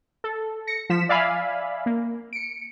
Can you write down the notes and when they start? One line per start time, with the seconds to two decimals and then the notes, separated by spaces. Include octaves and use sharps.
0.24 A4
0.67 A#6 C#7
0.90 F3 B6 E7
1.09 D5 E5 F5 G#5 B5
1.86 A#3
2.33 C#7 D7